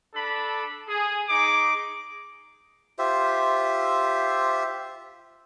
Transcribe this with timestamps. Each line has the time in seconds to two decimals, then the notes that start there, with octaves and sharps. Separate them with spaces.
0.14 D4 A4 B5
0.88 G#4
1.29 D#4 G#4 D6
2.99 F4 G4 C5 E5